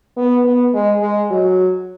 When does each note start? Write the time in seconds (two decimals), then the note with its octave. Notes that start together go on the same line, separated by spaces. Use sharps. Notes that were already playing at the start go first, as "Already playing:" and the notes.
0.17 B3
0.45 B3
0.74 G#3
1.01 G#3
1.31 F#3